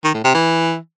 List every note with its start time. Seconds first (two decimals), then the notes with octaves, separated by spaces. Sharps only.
0.04 D#3
0.14 A2
0.24 C3
0.34 E3